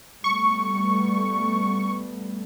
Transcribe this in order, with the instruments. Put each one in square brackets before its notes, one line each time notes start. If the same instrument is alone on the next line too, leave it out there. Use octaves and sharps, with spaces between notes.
[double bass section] G3 A3 B3 [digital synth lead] C#6